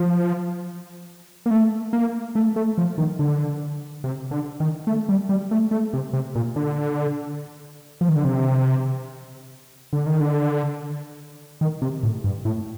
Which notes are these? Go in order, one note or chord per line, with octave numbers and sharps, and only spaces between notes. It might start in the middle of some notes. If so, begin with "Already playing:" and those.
Already playing: F3
A#3
A3
A#3
A3
A3
F3
D#3
D3
C3
D3
D#3
A3
G3
G3
A3
A3
C3
C3
A#2
D3
F3
D#3
D3
C3
D3
D#3
D3
D#3
C3
A2
G2
A2